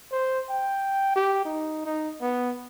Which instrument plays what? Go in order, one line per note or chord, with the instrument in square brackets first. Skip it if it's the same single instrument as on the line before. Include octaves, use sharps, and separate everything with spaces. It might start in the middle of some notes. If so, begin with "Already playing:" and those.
[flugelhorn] C5
G5
G4
D#4
D#4
B3